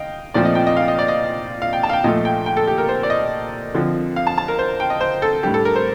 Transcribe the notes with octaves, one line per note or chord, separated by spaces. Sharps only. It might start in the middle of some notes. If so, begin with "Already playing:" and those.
Already playing: D#5 F5 G5
A#2 F3 A3 C4 D5
D#5
G5
D#5
F5
D#5
D5
D#5
F5
G5
A5
F5
G5
A#2 F3 A3 D#5
G5
G5
A4
G4
A#4
C5
D5
D#5
D3 F3 C4
F5
A5
A5
A#4
C5
G5
D#5
C5
A4
A2 G3 D4 G4
A4
A#4
C5